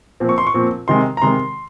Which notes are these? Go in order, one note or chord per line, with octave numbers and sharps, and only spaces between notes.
A#2 F3 C4
C#6
C6
C#6
A#2 F3 C4
C3 D#3 G#3 C6
A#5
C3 D#3 G#3 C6